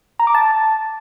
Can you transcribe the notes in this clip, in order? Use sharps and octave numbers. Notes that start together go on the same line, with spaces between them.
A#5
D6
A5